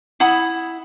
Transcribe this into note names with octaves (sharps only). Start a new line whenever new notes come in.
E4 F#5 B5 D#6